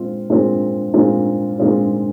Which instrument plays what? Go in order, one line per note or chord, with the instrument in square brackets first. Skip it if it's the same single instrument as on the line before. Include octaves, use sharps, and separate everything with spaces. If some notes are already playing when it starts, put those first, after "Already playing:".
Already playing: [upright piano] A#2 G#3 C4 F4
A#2 G#3 C4 F4
A#2 G#3 C4 F4
A#2 G#3 C4 F4